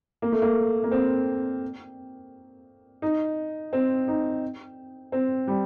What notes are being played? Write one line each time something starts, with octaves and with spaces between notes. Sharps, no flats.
A#3
A3
A#3
A#3
C4
D#4
C4
D#4
C4
G3